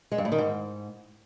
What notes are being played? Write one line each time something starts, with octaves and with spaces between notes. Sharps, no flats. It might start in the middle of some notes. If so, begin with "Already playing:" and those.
G#3
G2
A2
D#3
G#2